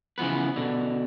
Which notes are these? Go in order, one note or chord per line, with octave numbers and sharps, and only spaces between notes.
C#3 E3 F3 B3 B4
B2 D3